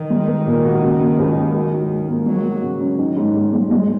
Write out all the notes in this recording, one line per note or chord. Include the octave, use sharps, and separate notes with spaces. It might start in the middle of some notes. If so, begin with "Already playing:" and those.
Already playing: D#3
G#3
A#4
A#2
F#4
C#3
A#3
C#2
F#3
F#3
G#2
G#2
A#3
F#3 G#3
F#4
C#3
C#4
D#3
G#2
G#2
G#3
G#3